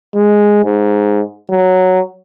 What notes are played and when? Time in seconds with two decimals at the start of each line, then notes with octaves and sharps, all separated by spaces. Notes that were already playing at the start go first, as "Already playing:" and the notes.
0.14 G#3
0.64 G#2
1.50 F#3